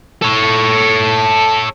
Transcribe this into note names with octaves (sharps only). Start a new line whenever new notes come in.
A4 C#5